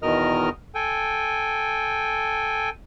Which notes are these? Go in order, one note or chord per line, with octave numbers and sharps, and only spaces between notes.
E2 B2 D#3 A#4 D#5 F6
A4 G5 G#5